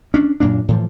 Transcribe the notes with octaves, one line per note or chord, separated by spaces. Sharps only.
C#4 D4
F#2 A#2 A#3 D4
A2 E3 F3